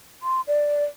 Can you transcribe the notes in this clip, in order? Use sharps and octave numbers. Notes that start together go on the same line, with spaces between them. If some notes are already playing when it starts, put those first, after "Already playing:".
C6
D5